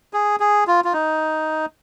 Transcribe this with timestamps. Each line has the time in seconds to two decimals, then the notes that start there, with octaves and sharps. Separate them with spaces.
0.13 G#4
0.40 G#4
0.67 F4
0.85 F4
0.93 D#4